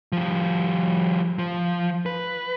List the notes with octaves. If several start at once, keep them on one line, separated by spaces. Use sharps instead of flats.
F3 G3
F3
B4